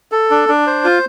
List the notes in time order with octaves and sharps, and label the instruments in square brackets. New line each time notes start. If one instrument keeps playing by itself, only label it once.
[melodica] A4
D4
D4
C5
F4